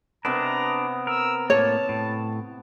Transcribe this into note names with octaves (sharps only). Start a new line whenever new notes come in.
C3 B3 D4 A#5
A#4 E6
A2 A#3 C#5 A5
A2